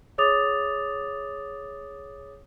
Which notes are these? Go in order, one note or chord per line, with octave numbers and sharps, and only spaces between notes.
G#4 C#5 D6 D#6 A6 F7